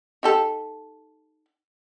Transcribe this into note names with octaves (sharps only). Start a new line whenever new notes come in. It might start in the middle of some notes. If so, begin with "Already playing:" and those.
D#4 G4 A4